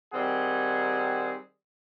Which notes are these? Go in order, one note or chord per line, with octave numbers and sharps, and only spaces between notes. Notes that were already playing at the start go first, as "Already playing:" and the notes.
D#3 G3 C4 G#4 F#5